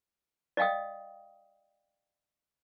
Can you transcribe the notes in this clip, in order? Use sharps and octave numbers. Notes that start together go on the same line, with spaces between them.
D5 D#5 F5 G5 D#6